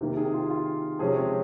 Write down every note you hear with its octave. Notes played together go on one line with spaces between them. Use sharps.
C3 D#3 A#3
G#4
F4
F4
C3 F3 G#3 C#4 G#4
C#5